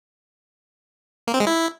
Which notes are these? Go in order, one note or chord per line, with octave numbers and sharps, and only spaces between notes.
A#3
C4
G#3
E4